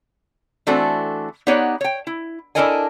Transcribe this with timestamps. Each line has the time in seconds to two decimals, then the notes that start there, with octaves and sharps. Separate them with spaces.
0.67 E3 A3 C4 D4 F#4 A4
1.47 B3 D#4 G4 C#5 D5 F#5
1.81 C#5 G5
2.07 E4
2.55 D4 E4 A4 A#4 D#5 G#5